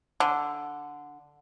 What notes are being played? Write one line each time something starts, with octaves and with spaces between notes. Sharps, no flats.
D3